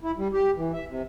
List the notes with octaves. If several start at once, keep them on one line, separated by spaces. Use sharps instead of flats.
E4
G3
G4
E3
E5
C3